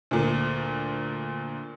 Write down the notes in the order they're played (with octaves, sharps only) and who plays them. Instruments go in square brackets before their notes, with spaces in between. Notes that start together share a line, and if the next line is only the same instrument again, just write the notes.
[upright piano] D2 A#2